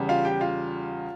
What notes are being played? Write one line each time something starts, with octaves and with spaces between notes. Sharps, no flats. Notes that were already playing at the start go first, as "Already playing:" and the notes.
Already playing: E2 C#3 G3
F4 F5
G4 G5
F4 F5